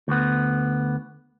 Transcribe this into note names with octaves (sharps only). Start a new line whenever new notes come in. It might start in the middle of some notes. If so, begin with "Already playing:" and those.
D2 B3